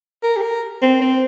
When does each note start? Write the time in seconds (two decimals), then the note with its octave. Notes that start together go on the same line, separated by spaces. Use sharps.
0.23 A#4
0.37 G4
0.42 A#4
0.82 C4
1.01 C4